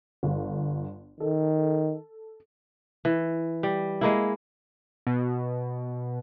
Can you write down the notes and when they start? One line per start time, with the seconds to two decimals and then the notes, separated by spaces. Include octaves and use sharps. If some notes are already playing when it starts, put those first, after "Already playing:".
0.23 G1
1.20 D#3 A4
3.05 E3
3.63 G3
4.01 G#3 A#3 E4
5.07 B2